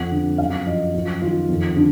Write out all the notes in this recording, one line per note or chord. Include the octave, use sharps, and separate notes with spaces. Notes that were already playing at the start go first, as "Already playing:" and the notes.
Already playing: F2 F#5
D3
F#2 F5
F3 D#5
F#2 F4
D#3 F4
F2
D3